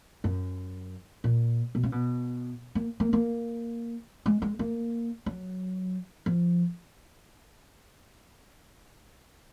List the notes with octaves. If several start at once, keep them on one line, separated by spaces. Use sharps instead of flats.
F#2
A#2
B2
C#3
B2
A#3
A#3
A#3
G#3
G#3
A#3
F#3
F3